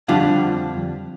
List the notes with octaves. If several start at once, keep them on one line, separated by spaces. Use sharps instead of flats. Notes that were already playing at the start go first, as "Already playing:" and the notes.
F2 D3 G3 D4 F4 F#5